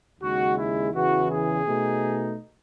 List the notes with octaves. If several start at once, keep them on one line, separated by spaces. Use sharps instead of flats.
D#2 C#3 G#3 F#4
E4
E2 C#3 E3 F#4
G#4
B2 A3 D#4